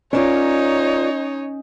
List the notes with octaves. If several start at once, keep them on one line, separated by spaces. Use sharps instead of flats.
C#4 D#4 F4 A#4 C#5 D5